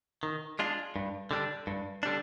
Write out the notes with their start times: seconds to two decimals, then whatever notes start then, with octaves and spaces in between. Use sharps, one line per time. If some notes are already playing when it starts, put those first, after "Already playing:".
0.23 D#3
0.59 G#3 D4 F4
0.96 G2
1.31 D3 G3 D4
1.67 G2
2.03 D3 G3 D4